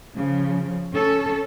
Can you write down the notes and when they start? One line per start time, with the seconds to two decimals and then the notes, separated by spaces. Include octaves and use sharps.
0.16 C#3 F3
0.93 C#4 A4